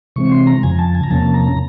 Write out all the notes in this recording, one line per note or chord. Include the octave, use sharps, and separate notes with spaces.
C3 E3 G#3 C4 C#6
C6
A#5
F2 C#3 F3 G#5
A5
G#5
A#5
E2 C3 F3 A#3 C#4 A5
A#5